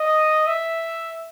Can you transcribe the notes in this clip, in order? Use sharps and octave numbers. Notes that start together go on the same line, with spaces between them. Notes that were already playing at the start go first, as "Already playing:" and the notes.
Already playing: D#5
E5